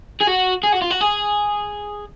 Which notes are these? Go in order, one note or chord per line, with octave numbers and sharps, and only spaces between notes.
G#4
F#4
G#4
F#4
F4
F#4
G#4